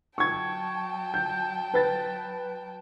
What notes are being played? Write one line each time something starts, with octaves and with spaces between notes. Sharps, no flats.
F#3 G5 A5 C#6 G#6
G6
B4 A6